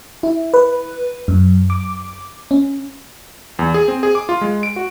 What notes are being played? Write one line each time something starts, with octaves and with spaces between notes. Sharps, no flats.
E4
B4
F#2
D6
C#4
E2
G#4
C4
G#4
D6
F4
G#3
D7
F#4